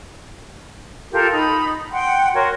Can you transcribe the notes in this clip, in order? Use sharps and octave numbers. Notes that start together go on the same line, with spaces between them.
F4 G4 A4 A#4
D#4 B5
F#5 G5 C6
F#4 A#4 C#5 C6